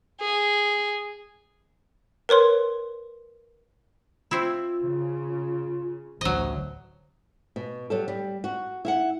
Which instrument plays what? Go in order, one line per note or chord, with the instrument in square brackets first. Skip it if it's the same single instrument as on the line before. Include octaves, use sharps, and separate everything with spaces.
[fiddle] G#4
[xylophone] A#4 B4 C#5 C6
[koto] C4 E4 [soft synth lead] F4
[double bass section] C#3
[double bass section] A1 D2 [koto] F#3 D#5 [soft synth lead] C5
[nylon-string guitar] B2
F#3 G3 A4
G3
F#4
E4 F5 F#5